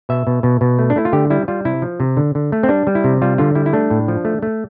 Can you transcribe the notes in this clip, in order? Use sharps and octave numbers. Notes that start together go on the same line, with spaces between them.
B2 E5
B2
B2
B2
A3
D4
A3 E4
F4
D3 G4
G3 E4
G3 F4
C3 E4
F3
C3
D3
D3
A3
C4
G3 D4
G3
E4
C3
G3 F4
D3 F4
G3 E4
E4
A3 D4
A2
F3
A3
A3